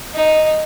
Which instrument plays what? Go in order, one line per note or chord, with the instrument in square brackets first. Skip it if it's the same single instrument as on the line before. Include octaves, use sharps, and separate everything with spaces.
[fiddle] D#4